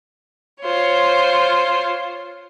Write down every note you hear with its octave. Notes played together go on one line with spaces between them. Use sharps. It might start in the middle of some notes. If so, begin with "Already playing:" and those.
F4 C5 C#5